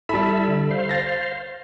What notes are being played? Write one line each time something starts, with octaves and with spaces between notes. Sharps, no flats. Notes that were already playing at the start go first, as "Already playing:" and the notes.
G3 E4 A4 E5 A5 B5
D3
C5 F5
A6 A#6